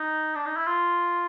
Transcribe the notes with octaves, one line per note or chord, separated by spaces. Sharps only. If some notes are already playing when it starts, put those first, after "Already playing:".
Already playing: D#4
D4
D#4
E4
F4